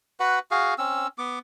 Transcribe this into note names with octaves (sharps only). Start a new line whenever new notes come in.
F#4 B4 F#5
F#4 G#4 F5
C4 C#4 E6
B3 D6